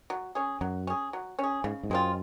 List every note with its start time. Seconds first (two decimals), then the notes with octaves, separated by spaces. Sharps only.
0.10 F#3
0.35 C#4 G#4
0.61 F#2 F#3
0.87 C#4 G#4
1.13 F#3
1.39 C#4 G#4
1.64 G#2 C#3
1.83 G#2
1.90 F#2 G#3 C4 F4